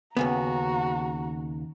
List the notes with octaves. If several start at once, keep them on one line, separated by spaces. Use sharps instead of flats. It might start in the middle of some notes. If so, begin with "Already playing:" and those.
D#2 C#3 B3 F#4 A#5